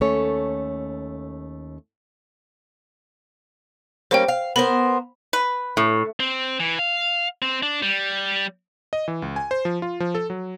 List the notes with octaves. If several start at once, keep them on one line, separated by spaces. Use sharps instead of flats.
D#2 A3 C#4 A4 C#5
G3 A#3 C#4 C5 G5
F5
B3 A#4 C5 B5
B4
A2
C4
E3
F5
C4
D4
G3
D#5
E3
C#2
G#5
C5
F3
F4
F3
A4
F#3